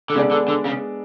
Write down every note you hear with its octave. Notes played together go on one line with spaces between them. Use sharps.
D3
C#3 G#3 B3 D4 A4 D5
D3
D3
C#3